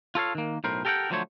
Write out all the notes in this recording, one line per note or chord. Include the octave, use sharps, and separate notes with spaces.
F4 A4 C#5 F5
D#3 A#3
B1 A2 A#4 C5
G4 A4 A#4 D5 F#5 G5
D3 F3 F#3 A3 C5 C#5